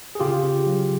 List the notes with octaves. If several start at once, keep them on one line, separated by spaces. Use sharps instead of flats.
G#4
C#3 F4 G4
C#3
F#3